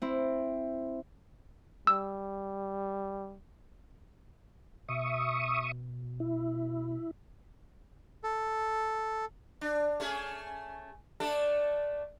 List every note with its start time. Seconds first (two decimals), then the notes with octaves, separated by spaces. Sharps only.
0.02 C4 E4
1.87 G3 E6
4.88 B2 E5 C#6 D#6
6.20 E4
8.24 A4
9.61 D4
10.00 A3 C#4 G#4
11.20 A3 D4 A4